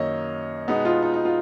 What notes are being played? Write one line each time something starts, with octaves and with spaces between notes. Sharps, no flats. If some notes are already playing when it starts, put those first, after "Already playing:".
Already playing: F#2 D#3 A#3 C#5 D#5
B2 G#3 B3 D#4
F4
D#4
D#4
F4